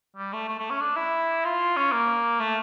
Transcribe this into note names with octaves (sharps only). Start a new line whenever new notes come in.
G3
A3
A3
A3
C#4
D4
E4
F4
C#4
A#3
A3